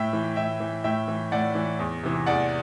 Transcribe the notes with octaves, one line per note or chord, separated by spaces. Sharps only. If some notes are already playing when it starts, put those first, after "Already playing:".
Already playing: A2 E5 G5
E3
A2 E5 G5
E3
A2 E5 G5
E3
A2 D5 F#5
E3
E2
C3 E3
E2 D5 F#5